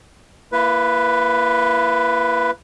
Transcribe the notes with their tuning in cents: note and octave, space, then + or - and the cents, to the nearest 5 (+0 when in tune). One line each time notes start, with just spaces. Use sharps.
A#3 +0 E4 +40 B4 +0